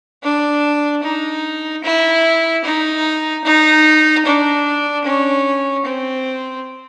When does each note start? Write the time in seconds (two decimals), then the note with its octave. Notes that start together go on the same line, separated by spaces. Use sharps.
0.23 D4
1.03 D#4
1.84 E4
2.64 D#4
3.44 D#4
4.25 D4
5.04 C#4
5.85 C4